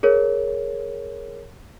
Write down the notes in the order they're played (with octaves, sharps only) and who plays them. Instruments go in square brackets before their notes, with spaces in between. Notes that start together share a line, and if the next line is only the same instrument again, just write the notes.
[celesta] G#4 A#4 C#5